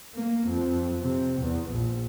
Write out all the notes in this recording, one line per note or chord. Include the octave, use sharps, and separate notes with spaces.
A#3
F2
C3
E2
A#1